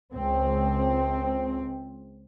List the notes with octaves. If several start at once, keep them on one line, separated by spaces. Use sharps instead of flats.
C#2 C4